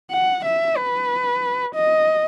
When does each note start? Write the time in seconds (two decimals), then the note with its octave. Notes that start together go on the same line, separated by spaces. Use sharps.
0.11 F#5
0.45 E5
0.77 B4
1.75 D#5